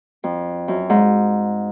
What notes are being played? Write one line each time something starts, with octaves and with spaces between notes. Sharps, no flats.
F2
F#2
G#2